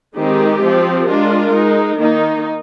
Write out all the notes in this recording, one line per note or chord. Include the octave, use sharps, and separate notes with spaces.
D#3 G#3 C4 D#4 G4
F3 C4 F4
G#3 D4 F4 A#4
G#3 D#4
D#3 A#3 D#4